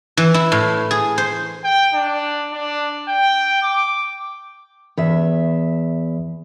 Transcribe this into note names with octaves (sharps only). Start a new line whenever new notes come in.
E3
E4
A2
G#4
C5
G5
D4
D4
G5
D6
E2 E5